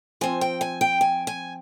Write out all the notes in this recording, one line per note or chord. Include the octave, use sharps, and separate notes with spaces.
F3 C4 G#5
G5
G#5
G5
G#5
G#5